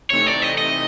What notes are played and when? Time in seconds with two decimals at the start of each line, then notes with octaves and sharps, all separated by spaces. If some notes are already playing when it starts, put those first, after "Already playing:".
0.10 C3 E3 A3 C4 D#4 C#5
0.27 D5
0.42 D#5
0.58 D#5